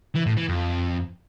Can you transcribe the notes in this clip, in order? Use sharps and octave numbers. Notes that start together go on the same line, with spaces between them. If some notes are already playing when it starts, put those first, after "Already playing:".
E3
A2
E3
F2